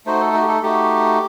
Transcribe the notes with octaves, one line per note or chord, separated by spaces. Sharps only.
A3 D#4 F#4 C5
A4
F#4
G4
A4
A3 D#4 F#4 G4